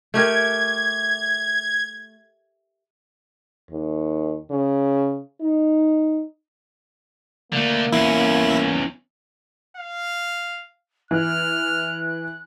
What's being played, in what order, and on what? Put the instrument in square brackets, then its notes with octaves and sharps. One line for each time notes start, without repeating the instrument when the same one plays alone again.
[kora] A3 G4 A#4 [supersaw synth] G#6
[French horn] D#2
C#3
D#4
[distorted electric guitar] D3 A3 [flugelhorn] A#3
[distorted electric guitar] E2 C#4 [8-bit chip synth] E4
[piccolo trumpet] F5
[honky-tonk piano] E3 [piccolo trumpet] F6 [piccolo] F#6